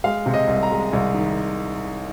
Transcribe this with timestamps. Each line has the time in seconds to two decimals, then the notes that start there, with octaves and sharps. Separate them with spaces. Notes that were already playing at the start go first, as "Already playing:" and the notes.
0.04 G#3 F5
0.26 C3
0.34 D#5
0.47 C2
0.63 A#5
0.70 G#3
0.93 C2
1.14 D#3